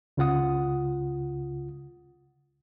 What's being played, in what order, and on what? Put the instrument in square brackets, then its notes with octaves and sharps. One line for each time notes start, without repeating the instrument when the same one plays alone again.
[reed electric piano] C#2 C#3 F4 F#5 D#6